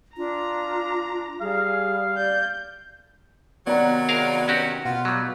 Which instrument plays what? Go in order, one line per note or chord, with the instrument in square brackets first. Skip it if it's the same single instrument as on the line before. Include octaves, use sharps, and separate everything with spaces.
[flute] D4 [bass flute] F4 [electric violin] A#5
[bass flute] G3 [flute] G#4 [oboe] F5
[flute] D5 [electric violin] G6
[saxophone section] C3 D#3 F#3 [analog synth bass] B3 [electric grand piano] D5 F#5 A#5
[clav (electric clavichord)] G#4 A#4 F5
C#4 F#4 G4
[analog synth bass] B2 [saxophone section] F4 [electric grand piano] F#5
[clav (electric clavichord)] F#3 G3